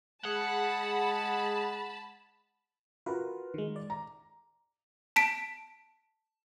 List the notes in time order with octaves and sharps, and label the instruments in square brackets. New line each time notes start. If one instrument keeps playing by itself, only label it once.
[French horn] G#3 [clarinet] G#4 [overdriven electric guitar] F#5 [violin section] A5 B5
[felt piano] F4 F#4 A#4 [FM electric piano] B4
[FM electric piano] D#3 G#3
D5
[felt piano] A#5
[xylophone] A5 B6 D7